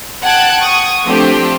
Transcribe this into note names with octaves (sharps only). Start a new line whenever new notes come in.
F#5 G5 A5 F#6 G#6
C#6 D#6
F3 A3 C4 D4 G4